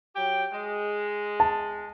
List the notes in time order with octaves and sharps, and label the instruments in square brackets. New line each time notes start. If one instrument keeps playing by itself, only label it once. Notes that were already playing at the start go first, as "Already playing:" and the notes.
[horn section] F#3 G4 G5
G#3
[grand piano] A5